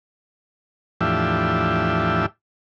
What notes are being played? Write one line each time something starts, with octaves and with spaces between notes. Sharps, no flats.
E2 A2 F3 D4 G4 E5